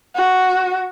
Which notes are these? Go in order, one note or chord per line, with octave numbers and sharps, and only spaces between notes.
F#4